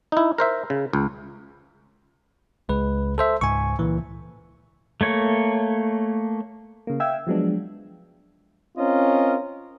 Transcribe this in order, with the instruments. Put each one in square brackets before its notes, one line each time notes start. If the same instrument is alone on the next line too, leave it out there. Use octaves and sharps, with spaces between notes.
[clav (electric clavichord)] D#4 E4
A#4 C5 E5
C#3
C#2
[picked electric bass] C#2 [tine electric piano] G#3 B4
[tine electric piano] A4 C5 E5
[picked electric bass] C#2 G#2 [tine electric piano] G#5 C#6
[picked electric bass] C#2 A#2 [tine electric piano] E3
[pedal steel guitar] A3 A#3 C#5
[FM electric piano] C#3 A#3
E5 F5 G5 E6 G#6
F3 F#3 G#3 B3 D4
[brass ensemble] C4 C#4 F4 A#4 D#5